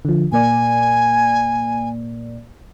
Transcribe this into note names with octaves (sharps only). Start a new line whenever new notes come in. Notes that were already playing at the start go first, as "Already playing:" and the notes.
D3 F3
A#2 A#3 D5 G#5